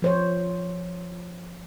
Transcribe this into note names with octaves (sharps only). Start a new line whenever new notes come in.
F3 C5 C#5